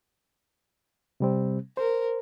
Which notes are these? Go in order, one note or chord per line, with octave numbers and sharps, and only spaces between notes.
C3 G3 C4
A#4 C5